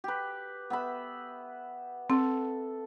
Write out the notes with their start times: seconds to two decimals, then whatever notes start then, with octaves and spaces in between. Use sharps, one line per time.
0.04 G4 B4
0.70 B3 E5 B5
2.10 C4 A4